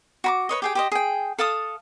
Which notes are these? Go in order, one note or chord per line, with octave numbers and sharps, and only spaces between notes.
F#4 B5 D6
B4 C#5 D#5
G4 G#4 G5
G4 C5 D#5
G#4 G5
A4 F5 A5 D#6